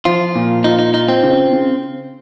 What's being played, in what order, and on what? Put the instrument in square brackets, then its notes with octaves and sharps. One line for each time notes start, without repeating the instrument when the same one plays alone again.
[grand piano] F3 [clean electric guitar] F4
[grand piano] A#2
[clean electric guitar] D#4 [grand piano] F4
[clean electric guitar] D#4
[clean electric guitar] D#4 [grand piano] F4
[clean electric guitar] C4
[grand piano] C#3
C#3